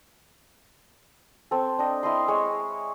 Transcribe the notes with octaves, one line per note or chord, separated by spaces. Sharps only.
C4 A4
D4 D#5 G5
E4 D#5 C6
G#3 C#5 G#5